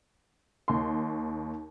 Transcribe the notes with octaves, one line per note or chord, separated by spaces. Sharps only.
D#2 C6